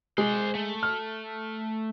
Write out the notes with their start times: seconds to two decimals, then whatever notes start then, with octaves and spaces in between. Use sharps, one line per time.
0.18 G#3 C5 D5
0.55 A3
0.83 F6